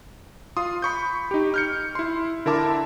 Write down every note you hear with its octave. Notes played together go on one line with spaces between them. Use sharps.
F4 C6 D#6
B5 C#6 G6
D#4 G4
F6 G6 C#7
E4 C6
D3 E4 A#4 E5 A5 D6